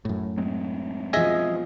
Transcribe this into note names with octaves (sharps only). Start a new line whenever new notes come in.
F#2 A2
F#3 G#3 C4
B2 F3 G#4 D#5 E5